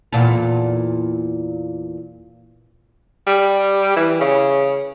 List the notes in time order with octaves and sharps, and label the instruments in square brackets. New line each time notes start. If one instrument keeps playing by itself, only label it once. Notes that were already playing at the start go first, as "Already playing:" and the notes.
[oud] E2 A#2 A4
[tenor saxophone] G3
E3
C#3